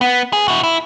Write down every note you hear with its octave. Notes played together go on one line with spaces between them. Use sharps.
B3
G#4
E4 F#4
E4